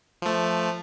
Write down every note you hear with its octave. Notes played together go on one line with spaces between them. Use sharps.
F3 A3